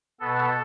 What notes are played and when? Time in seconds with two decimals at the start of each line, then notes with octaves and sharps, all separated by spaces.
0.20 B2 B3 A4